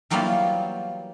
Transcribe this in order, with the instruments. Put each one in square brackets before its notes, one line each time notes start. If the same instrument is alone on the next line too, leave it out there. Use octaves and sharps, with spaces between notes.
[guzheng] E3 F#3 G3 A#3 B3 F4